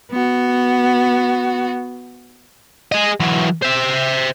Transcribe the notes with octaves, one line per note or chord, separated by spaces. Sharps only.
B3 F#4
G#4 D#5
E3 F#3
C5 E5